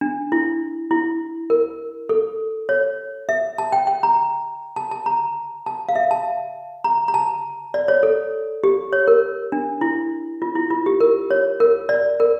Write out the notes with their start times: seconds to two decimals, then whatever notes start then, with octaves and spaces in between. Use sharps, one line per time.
0.01 D4
0.32 E4
0.91 E4
1.50 A#4
2.09 A4
2.69 C#5
3.29 E5
3.58 A5
3.72 G5
3.87 G5
4.03 A#5
4.76 A5
4.91 A5
5.06 A#5
5.66 A5
5.89 F5
5.95 E5
6.11 A5
6.84 A#5
7.08 A#5
7.14 A5
7.74 D5
7.88 C#5
8.03 A4
8.64 G4
8.93 C#5
9.08 A#4
9.52 D4
9.81 E4
10.42 F4
10.55 E4
10.70 F4
10.86 G4
11.00 A#4
11.31 C#5
11.60 A#4
11.89 D5
12.20 A#4